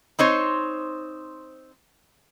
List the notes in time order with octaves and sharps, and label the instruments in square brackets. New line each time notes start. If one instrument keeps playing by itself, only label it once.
[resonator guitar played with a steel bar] C4 D#4 C5 C#5